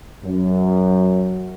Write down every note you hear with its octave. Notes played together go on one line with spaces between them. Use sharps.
F#2